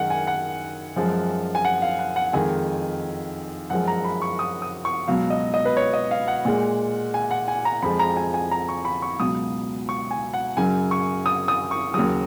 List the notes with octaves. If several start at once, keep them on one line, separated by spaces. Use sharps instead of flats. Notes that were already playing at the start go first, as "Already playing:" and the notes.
Already playing: F#2 D#3 G#3 F#5
G#5
F#5
F#2 F3 G#3
G#5
F#5
F5
F#5
F#5
F2 D#3 G#3 G#5
F#2 F3 G#3 F#5
A#5
B5
C#6
D#6
D#6
C#6
C#2 B2 F#3 F5
D#5
D#5
B4
C#5
D#5
F5
F#5
A#2 G#3
G#5
F#5
G#5
A#5
F2 F3 G#3 B5
A#5
G#5
G#5
A#5
C#6
B5
C#6
C#2 B2 F#3 D#6
C#6
G#5
F#5
F#2 C#3 F#3 G#5
C#6
D#6
D#6
C#6
D#2 C#3 F#3 D#6